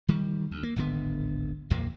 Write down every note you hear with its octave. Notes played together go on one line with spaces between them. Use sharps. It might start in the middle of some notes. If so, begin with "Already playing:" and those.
D#3 G3
D2
A#3
D1 G#1 D3 B3
A#1 E2 A#2 A#3